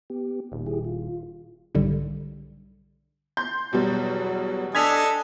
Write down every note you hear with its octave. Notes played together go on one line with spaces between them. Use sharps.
B3 G4
D#1 A#2
E4 G4 G#4
F4
B1 G#2 D3 G3
C6 G6
E2 B2 F#3 G3
D4 A4 D#5 G#5 G#6 B6 F7